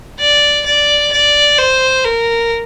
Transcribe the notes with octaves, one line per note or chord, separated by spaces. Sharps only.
D5
D5
D5
C5
A#4